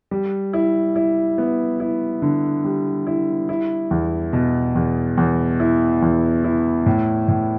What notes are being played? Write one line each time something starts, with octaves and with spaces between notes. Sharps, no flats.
G3
E4
E4
B3
E4
D3
G3
E4
E4
E2
B2
E2
E2
E4
E2
E4
A2
A2